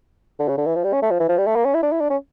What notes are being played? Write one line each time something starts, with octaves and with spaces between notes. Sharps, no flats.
D3
C#3
D3
E3
F3
G3
C#4
A3
F3
E3
F3
G3
A3
A#3
C#4
E4
D4
E4
D4
C#4